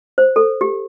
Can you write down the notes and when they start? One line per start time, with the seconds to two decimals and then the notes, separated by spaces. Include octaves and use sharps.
0.18 C5
0.36 A4
0.61 G4